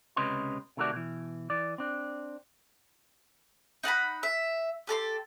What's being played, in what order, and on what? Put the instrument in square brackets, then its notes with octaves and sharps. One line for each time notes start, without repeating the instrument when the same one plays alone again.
[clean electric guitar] C#2 C3 C#4 B4 D#5 C6
C3 D#3 A3 C#4 F#4 D5
B2 E3
E3 D5
C4 D4
[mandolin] D#4 F#5 A5 B5
E5
G4 A4 A#5 C6